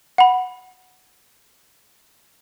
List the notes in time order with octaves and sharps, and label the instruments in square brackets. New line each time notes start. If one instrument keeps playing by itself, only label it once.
[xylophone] F#5 B5